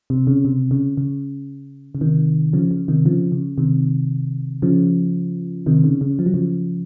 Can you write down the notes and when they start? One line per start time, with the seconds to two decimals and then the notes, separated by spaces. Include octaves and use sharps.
0.10 C3
0.27 C#3
0.45 C3
0.71 C#3
0.97 C#3
1.95 C#3
2.01 C3 D#3
2.53 C#3 F3
2.71 C#3
2.88 C3 D#3
3.05 C#3 F3
3.32 C#3
3.58 C3 D#3
4.62 C#3 F3
5.66 C3 D#3
5.84 C#3
6.01 C#3
6.19 F3
6.26 F#3
6.34 C#3 F3